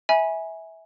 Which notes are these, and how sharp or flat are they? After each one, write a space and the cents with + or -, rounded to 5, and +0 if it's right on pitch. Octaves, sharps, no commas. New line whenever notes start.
E5 -20 G#5 +0 B5 -20